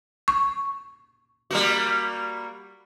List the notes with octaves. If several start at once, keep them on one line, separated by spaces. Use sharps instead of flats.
C#6
G3 A#3 F#4